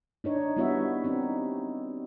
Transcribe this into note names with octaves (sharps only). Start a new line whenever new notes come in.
D4 D#4 C#5
G3 B3 E4 F#4 C#5 E5
C4 D#4